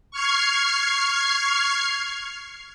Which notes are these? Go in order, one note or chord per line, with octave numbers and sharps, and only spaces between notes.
C#6 F6 G#6 C7